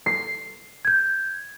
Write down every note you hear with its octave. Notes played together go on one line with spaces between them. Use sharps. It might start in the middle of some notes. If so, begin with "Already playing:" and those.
C7
G6 G#6